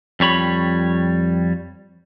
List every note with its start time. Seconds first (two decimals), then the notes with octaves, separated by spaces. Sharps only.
0.20 F2 G3 C#5 B5